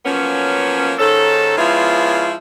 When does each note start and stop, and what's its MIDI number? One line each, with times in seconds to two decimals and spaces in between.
0.05 0.93 53
0.05 0.93 54
0.05 0.93 58
0.05 0.93 59
0.05 0.93 61
0.99 1.55 44
0.99 1.55 51
0.99 1.55 61
0.99 1.55 69
1.57 2.33 53
1.57 2.33 56
1.57 2.33 59
1.57 2.33 61
1.57 2.33 64
1.57 2.33 65